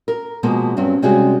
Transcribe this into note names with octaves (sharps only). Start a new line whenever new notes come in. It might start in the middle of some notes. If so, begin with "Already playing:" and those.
A#4
B2 F3 G#3 A#3 B3
G2 F#3 C4 C#4
C3 G3 G#3 C#4 F#4 G#4